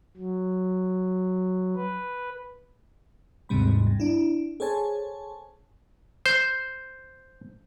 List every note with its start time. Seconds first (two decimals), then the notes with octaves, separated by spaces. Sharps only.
0.17 F#3
1.76 B4
3.49 G#1 D#2 G#2 C3 G3 B5
3.87 G2
4.00 D4 E4
4.60 G#4 A4 C5 C#5 G#5 A5
6.26 C5